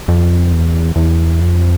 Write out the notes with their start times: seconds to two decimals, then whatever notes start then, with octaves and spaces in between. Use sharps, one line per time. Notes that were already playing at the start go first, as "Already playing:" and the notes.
0.08 F2
0.52 E2
0.96 E2
1.41 F2